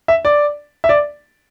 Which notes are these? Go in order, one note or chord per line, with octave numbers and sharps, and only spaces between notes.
E5
D5
E5
D5